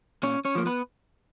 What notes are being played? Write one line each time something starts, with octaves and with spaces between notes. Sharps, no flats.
A#2 C#4 C#5
C#4 C#5
F3 A#3
B3 B4